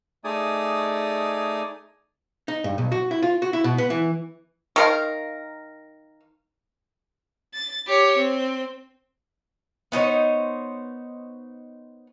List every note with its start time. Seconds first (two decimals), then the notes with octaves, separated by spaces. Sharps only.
0.24 A3 D#4 G#4 D5 G#5 D#6
2.48 D#4
2.64 G2
2.78 B1
2.92 F#4
3.11 E4
3.23 F4
3.42 F#4
3.53 E4
3.64 B2
3.78 B3
3.90 E3
4.76 D#3 A#4 F5
7.54 A6
7.87 G4 C#5
8.17 C4
9.92 B3 D#4 C5 C#5